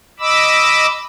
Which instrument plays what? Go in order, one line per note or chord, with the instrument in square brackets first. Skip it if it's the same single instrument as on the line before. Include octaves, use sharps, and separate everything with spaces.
[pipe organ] D#5 B5 D6 E6